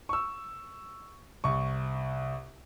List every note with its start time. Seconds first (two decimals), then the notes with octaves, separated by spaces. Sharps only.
0.09 C#6 E6
1.44 C2 C#6